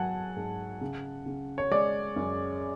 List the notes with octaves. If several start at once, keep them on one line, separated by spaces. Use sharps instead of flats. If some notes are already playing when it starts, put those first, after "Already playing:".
Already playing: G#2 F#3 F#5 G#5 A5
G#2
C#3
C#3
C#5
G#3 D5
F#2